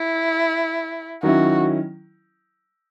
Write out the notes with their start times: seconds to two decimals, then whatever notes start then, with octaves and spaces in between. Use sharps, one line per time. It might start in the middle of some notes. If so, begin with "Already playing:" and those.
Already playing: E4
1.23 D#3 F#3 C#4 E4 F#4